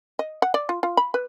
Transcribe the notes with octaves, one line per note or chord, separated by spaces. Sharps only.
D#5
F#5
D5
F4
F4
B5
B4